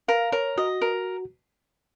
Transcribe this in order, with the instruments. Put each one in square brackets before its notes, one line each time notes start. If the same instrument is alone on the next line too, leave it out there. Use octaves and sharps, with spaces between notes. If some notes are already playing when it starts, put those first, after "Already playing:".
[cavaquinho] A#4 [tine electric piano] F5
[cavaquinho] A#4 [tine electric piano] C#5
[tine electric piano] F#4 [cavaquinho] D#5
[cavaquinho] A#4